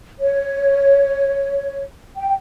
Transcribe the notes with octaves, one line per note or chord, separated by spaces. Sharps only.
C#5
G5